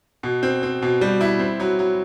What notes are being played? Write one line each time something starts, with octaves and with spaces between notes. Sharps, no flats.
B2
C4
C4
B2
G3
E4
C4
F#3
F#3